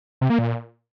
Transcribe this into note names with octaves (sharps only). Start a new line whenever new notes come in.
C3
A#3
A#2